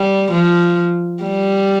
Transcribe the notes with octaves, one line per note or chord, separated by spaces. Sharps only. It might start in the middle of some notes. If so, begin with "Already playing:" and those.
Already playing: G3
F3
G3